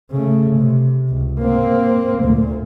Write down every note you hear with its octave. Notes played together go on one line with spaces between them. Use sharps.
C#3 A3
C3
C#2
A#3 C4
D2 A#2